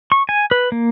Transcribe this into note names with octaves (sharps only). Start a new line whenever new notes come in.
C#6
G#5
B4
A#3